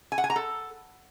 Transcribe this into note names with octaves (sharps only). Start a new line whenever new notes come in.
G#5
F#5
G#5
A#5
A4